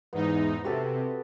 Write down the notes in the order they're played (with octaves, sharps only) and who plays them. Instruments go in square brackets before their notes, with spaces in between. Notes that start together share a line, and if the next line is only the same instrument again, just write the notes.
[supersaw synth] E2 G#2 D#4 [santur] B3
[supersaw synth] C3 [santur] F#4 G4 A4